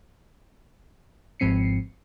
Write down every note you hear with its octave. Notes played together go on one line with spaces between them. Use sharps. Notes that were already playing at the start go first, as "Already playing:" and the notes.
G#1 G#2 F3 C4 C7 C#7